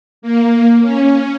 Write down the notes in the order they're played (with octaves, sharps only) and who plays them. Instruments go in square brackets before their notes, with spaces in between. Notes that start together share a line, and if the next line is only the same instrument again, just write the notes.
[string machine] A#3
C#4